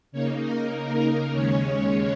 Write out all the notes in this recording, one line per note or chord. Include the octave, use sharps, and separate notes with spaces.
C#3 A#3 D#4 C#5
A#4
D#2 C#3 G#3 C#4 C#5